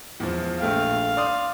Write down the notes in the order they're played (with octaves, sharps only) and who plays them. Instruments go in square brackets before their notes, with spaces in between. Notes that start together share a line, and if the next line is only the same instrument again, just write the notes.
[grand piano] E2 F3
[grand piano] A#1 A3 G5 [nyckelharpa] F5
[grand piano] D5 C6 D#6